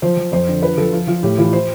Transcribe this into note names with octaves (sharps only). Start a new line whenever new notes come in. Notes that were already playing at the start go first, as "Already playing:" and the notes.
F3 C5
F3
F2 C5
D3
F3 B4
F3 A4
F3 F4
F3 F4
A2 G4
E3 F4
C5